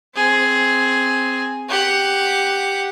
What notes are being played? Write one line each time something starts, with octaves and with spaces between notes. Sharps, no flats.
C4 G#4
G4 F#5